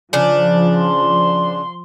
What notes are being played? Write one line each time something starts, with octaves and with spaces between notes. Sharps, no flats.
C#3 F3 D4
C6